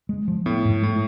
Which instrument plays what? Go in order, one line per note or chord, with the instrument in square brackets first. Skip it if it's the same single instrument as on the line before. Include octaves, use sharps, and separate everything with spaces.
[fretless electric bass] G#3
F3
[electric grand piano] A2 [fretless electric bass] B3
[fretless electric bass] G#2
[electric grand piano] A2 [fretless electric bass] G#3